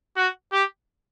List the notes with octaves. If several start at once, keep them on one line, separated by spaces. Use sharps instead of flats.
F#4
G4